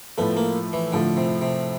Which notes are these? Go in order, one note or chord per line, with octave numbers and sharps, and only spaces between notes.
A2 F3 A3 B3
A#3
E3
A2 D3 F3 A3
C3
C3